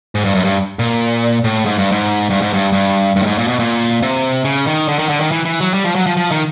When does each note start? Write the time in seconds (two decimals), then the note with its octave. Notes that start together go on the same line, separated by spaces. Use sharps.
0.15 G#2
0.24 G2
0.35 F#2
0.45 G2
0.79 A#2
1.44 A2
1.65 G#2
1.78 G2
1.92 G#2
2.30 G2
2.42 G#2
2.53 G2
2.73 G2
3.16 G2
3.22 A2
3.26 G#2
3.38 A#2
3.48 B2
3.59 A#2
4.02 C3
4.45 C#3
4.67 D#3
4.88 D3
4.99 D#3
5.09 D3
5.21 D#3
5.32 E3
5.45 E3
5.60 F#3
5.74 G3
5.84 F3
5.95 F#3
6.07 F3
6.17 F3
6.31 D#3